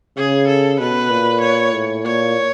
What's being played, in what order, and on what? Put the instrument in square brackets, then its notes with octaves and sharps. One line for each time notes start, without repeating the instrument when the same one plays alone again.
[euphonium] C#3 [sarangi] G#4
[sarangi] A4
[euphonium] B2 [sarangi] B4
[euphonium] A#2
[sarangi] C#5
[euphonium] A2
[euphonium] A#2 [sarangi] C#5